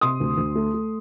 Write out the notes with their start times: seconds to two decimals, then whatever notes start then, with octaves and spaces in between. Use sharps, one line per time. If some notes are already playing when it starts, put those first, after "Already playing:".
0.01 C3 C6 D#6
0.20 D2
0.37 D2
0.55 A3
0.74 A3